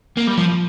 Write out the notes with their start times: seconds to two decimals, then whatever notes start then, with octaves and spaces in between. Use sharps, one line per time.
0.17 A#3
0.27 G3
0.38 F3